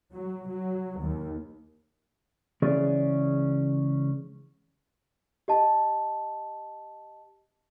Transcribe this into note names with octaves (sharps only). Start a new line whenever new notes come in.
F#3
F#3
D#2
C#2 E3 C#4 G#4 D5
G4 D#5 A5